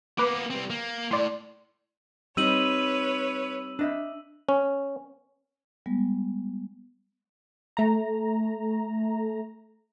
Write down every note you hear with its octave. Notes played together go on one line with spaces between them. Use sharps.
A#3 B3 B4 D6
G3 C4
A#3
A2 D5 C6
G3 C4 D#4 B4 C#5 E6 D#7 F#7
D4 D#5 E5
C#4
G3 G#3 B3
A3 A#5